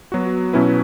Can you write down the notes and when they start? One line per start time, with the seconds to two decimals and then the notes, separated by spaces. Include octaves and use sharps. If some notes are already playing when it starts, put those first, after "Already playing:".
0.12 F#3 B3 F#4
0.53 B2 F#3 C#4 E4 B4